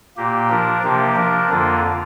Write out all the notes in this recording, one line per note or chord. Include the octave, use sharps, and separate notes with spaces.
A#2 A#3 G4
F3 D4 A#4
C3 F3 A#3 G4
F3 D4 A#4
F2 D3 A#3 F4